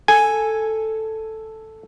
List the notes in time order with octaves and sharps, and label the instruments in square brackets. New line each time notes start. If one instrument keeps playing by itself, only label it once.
[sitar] A4 [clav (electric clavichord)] G#5